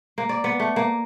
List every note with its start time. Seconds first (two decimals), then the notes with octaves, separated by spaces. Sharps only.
0.18 A#3
0.29 D5
0.44 B3
0.60 A3
0.76 A#3